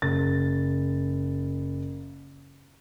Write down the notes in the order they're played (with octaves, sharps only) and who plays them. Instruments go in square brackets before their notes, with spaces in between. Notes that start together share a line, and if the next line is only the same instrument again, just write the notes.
[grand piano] F#1 A6